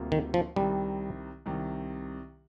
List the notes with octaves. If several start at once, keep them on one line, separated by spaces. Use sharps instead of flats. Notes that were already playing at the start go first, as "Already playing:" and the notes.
Already playing: D2 C3 G3 A#3 F4
D#3
F3
C2 C3 D#3 G3
C2 C3 D#3